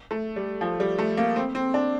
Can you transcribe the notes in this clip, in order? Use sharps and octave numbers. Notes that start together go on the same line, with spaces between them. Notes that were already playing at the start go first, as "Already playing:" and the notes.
A3
G3
F3
G3
A3
A#3
C4
C4
D4